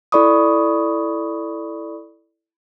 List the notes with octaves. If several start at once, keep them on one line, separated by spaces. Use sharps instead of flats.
E4 A4 D5 B5 C#6 D#6